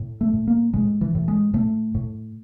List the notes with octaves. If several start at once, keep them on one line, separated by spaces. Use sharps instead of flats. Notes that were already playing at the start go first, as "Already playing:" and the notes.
Already playing: A2
A3
A2
A#3
A2 G#3
E3
A2
G#3
A2 A3
A2